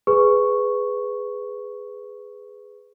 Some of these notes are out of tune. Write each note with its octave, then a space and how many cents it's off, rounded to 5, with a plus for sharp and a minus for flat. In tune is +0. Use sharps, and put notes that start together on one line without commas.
G#4 +0 B4 +15 C#6 +0